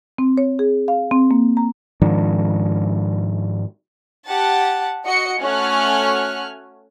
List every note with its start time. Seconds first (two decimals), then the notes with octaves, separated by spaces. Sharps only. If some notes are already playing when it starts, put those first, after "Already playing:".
0.18 C4
0.38 C#5
0.59 G#4
0.88 F5
1.11 C4
1.31 A#3
1.57 A#5
2.02 G#2 D#3 F3 D4
4.26 G4 F#5 A5
5.04 F#4 D#5 C#7
5.41 A3 C#4 F#4 G#5 F6 F#6